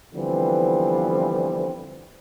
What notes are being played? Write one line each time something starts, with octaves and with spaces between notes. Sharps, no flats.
D3 E3 F3 G3 B3 C4